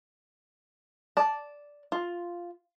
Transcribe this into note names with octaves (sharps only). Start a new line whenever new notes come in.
D5 A5
F4